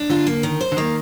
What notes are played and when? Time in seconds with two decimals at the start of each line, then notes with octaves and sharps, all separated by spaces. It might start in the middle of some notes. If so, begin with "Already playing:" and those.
Already playing: D4
0.10 D3 F4
0.27 A#3
0.43 D#3
0.61 C5
0.72 D3
0.77 D#3 A#3